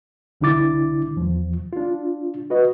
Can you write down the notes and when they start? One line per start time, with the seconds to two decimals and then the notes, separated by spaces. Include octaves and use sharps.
0.41 C2 D3 D4 E4 D6 A6
1.16 E2 F3
1.73 D4 F4
2.50 F#4 B4 D#5